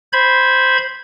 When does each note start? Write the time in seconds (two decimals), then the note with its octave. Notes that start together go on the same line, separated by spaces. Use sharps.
0.13 C5 B5 G#6